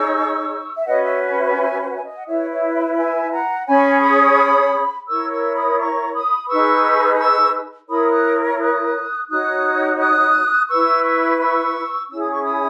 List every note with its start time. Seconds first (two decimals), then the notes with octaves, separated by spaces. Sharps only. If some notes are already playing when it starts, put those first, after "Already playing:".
Already playing: D#4 G#4 C#5 C#6 E6
0.76 E5
0.86 C#4 F#4 B4 D#5 F#5
1.03 C#5 E5
1.38 C#5 E5
1.57 E5 G#5
1.81 G#5
1.87 F#5
1.95 E5 G#5
2.04 D#5
2.16 F#5
2.26 E4 B4 C#5 E5
2.50 C#5 E5
2.74 C#5 E5
2.96 E5 G#5
3.32 F#5 A#5
3.67 C#4 G#4 C#5 G#5 B5
4.02 B5 D#6
5.07 E4 A#4 C#5 C#6 E6
5.30 C#6 E6
5.55 B5 D#6
5.78 A#5 C#6
6.13 B5 D#6
6.48 D#4 G#4 B4 C#6 E6
7.18 C#6 E6
7.88 E4 A#4 C#5 B5 D#6
8.11 D#6 F#6
8.59 D#6 F#6
9.28 D#4 F#4 C#5 D#6 F#6
9.99 D#6 F#6
10.69 E4 B4 C#6 E6
11.04 C#6 E6
11.40 C#6 E6
12.09 C#4 E4 G#4 E6
12.22 D#6
12.32 C#6
12.44 B5 D#6